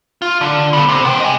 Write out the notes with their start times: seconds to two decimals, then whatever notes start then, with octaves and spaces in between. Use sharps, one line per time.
0.22 F4
0.41 D3
0.73 B3 A4
0.89 C3
1.05 B3 G5
1.20 D#5 G#5